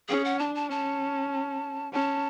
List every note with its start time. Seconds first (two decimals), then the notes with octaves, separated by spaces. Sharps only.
0.09 C#4 G#4
0.24 F#5
0.39 D4 A5
0.55 A5
0.70 C#4 A5
1.93 C#4 A5